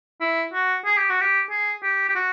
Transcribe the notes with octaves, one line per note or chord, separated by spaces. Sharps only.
E4
F#4
G#4
G4
F#4
G4
G#4
G4
G4
F#4